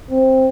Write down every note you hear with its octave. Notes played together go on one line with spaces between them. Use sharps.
C4